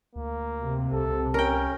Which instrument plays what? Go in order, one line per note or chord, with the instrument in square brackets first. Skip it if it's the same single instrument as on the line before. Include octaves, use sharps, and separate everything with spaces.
[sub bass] D2 [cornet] A#3
[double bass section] C3
[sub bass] C2 [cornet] A4
[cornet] C#4 [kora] A#4 G5